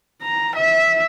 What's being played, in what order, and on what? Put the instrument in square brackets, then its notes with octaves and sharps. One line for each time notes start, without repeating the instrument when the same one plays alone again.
[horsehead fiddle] A#5
E5